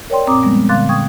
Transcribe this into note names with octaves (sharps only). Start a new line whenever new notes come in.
A#4 C#5 D5 G5 C6
F#2 A#2 C4 A#5 D6 D#6
F3 G3 G#3 B3
A#2 D3 F5 C6 F#6 A6
G5 C#6 D#6 G#6